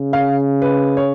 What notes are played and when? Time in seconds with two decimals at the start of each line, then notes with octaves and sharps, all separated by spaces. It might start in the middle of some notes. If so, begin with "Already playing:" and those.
Already playing: C#3
0.13 F5
0.62 B4
0.97 C#5